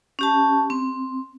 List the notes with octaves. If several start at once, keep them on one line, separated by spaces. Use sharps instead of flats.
C#4 G4 A5
C4